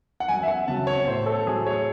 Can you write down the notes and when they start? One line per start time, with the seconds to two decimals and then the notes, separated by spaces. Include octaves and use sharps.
0.20 F#5
0.28 F#2 G#5
0.43 E5
0.48 F#5
0.68 C#3 F#3 A5
0.87 C#5
1.07 A2 C5
1.26 A4
1.46 F#3 A3 G#4
1.66 C#5